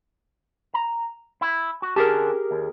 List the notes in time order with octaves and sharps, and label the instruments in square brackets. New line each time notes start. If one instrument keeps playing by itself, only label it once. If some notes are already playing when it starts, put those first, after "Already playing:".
[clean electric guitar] A#5
E4
F#4
[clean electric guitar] D3 C#4 A5 [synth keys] G4 G#4 A#4
[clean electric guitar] D#2